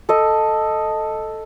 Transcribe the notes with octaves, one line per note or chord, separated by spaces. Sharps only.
A4 D#5